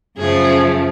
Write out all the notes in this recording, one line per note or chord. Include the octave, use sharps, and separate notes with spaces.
F#2 C#3 F3 A3 G#4